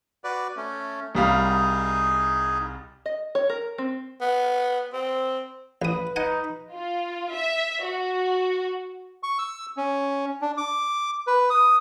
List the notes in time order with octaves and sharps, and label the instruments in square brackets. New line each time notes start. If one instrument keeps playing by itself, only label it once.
[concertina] F#4 B4 D5
A3 C#4
[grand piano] C2 G3 F5 [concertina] D#4 G#4
[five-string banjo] D#5
C#5
A#4
C4
[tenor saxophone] B3
C4
[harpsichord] A1 D#6 [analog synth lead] B4
[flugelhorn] D#4 [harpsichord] F#5 G#5
[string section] F4
E5
F#4
[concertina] C#6
E6
C#4
D4
D6
B4
D#6